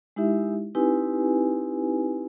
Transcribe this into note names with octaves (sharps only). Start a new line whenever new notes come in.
G#3 D#4 E4 G4 E5
C4 D#4 E4 G4 B4 G#5